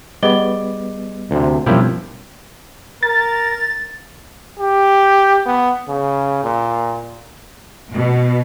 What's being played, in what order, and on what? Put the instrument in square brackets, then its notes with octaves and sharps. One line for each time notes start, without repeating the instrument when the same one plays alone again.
[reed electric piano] G3 B3 [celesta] G#4 D#5 G7 [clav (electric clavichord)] D5
[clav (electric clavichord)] D2 C3
[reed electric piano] F2 A#3 C#4 [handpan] B2 G3 [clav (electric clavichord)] F3 E4 G4
[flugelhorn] A#4 [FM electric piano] A6
[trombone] G4
B3
C#3
A#2
[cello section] B2